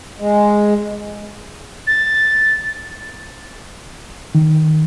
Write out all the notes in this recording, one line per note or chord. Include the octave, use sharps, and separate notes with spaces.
G#3
A6
D#3